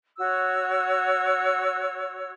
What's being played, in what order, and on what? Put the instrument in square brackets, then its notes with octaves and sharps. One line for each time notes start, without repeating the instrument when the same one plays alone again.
[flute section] F#4 C#5 E6